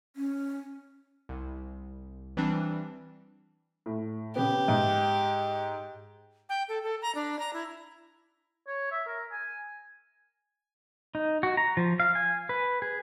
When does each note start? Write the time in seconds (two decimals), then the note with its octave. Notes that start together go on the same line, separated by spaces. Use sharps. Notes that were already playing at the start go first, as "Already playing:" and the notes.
0.16 C#4
1.29 C2
2.37 E3 G3 C4 D4
3.86 A2
4.36 C#3 B3 G4
4.68 G#2
6.49 G5
6.69 A4
6.83 A4
7.02 A#5
7.15 D4
7.39 A#5
7.53 E4
8.67 C#5
8.91 E5
9.07 A#4
9.32 G#5
11.15 D#4
11.43 F#4
11.57 A#5
11.77 F3
12.00 F5
12.15 G#5
12.49 B4
12.82 G#4